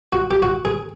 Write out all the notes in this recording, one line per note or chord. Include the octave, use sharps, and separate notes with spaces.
F#4
G4
F#4
G#4